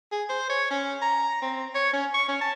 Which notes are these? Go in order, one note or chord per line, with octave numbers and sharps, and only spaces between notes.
G#4
C5
C#5
C#4
A#5
C4
C#5
C#4
C#6
C#4
A5